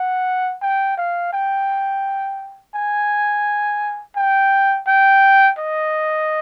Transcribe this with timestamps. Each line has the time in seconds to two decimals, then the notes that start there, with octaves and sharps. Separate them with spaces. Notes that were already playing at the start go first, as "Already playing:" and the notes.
Already playing: F#5
0.62 G5
0.97 F5
1.33 G5
2.75 G#5
4.16 G5
4.87 G5
5.58 D#5